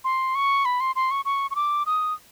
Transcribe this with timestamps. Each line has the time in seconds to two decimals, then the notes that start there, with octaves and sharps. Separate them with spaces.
0.04 C6
0.35 C#6
0.65 B5
0.80 C6
0.96 C6
1.11 C#6
1.25 C#6
1.51 C#6
1.56 D6
1.86 D#6